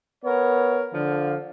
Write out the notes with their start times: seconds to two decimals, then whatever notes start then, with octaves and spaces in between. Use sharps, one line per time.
0.25 B3 A#4 C#5
0.94 D3 F3 F5